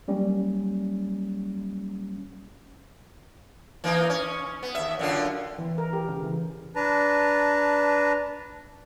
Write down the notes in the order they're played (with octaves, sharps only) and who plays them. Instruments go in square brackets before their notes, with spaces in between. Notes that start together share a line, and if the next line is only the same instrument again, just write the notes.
[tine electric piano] F#3 G3 A#3 C#4
[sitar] E3 A#3 D#4
C#4
B3
D#2 E5
F#2 D3 F4
[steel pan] E3
A#4
G4
C#3
E3
[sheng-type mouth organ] D4 B4 A5 A#5